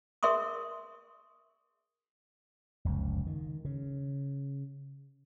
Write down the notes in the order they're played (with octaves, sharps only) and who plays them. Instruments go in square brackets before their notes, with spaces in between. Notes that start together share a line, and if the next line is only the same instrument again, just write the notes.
[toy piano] G#4 A#4 E5 C6 C#6 D#6
[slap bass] F1 C#2 F#2
D#3
C#3